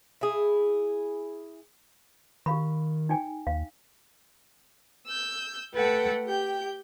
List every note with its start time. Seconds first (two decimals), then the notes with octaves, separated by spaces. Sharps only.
0.21 E4 G#4
2.46 D#3 G4 F5 B5
3.09 D#4 G5 G#5
3.47 D#2 F5
5.07 E6 G6
5.75 A3 A4 B4 F#5 G5
6.26 G4 G5 G6